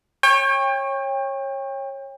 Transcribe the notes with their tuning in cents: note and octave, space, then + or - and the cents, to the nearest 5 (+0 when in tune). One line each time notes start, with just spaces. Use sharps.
C#5 -20 G5 +30